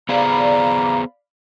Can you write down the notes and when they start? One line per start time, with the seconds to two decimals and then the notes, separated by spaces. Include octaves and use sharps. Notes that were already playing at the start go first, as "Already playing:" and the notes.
0.09 B3 G#4 C5 D5 F5 A#5 B5